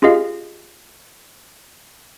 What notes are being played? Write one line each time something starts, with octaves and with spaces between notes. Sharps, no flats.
C#4 F4 G4 G#4 D#5 F5